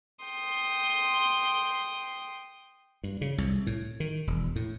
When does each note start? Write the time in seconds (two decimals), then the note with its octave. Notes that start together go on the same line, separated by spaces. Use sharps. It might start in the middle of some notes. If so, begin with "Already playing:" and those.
0.24 G5 C6 D#6
3.04 G2
3.21 C#3
3.38 C2
3.67 A2
4.00 D#3
4.27 E1
4.56 A2